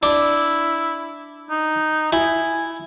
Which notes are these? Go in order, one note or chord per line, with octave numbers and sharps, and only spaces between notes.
D4 E4
D#4
E4 G#5